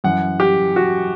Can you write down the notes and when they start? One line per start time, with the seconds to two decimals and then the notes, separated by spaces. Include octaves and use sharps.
0.04 F#2 E3 F#5
0.40 G4
0.76 F#4